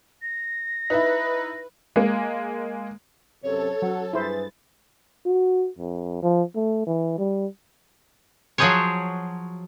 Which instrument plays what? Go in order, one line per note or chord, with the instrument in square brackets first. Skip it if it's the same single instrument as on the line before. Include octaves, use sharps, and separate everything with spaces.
[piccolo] A#6
[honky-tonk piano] D#4 E4 [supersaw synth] B4
[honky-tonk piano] G#3 A#3
[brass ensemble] F#2 C3 [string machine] A4 [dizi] C#5
[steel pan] F#3 [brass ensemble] C#4 F#4 F#5
[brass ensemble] G2 G#4 B4 [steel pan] E4 C5 [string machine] A6
[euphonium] F#4
F2
F3
A3
E3
G3
[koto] F3 F#3 F#4 G#4 C5 C#5